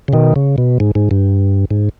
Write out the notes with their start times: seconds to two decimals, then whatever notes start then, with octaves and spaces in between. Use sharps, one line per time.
0.08 C#3
0.13 B2 D#3
0.36 C#3
0.58 B2
0.80 G#2
0.95 G#2
1.11 G2
1.71 G#2